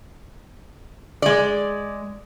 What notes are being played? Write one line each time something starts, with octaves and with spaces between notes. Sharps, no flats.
G#3 D5